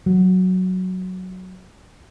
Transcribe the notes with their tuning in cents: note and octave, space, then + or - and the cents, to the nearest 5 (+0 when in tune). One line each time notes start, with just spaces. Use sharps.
F#3 +0